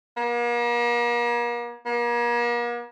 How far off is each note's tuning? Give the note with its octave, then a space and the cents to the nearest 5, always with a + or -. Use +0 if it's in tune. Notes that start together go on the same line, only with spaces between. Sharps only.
A#3 +40
A#3 +40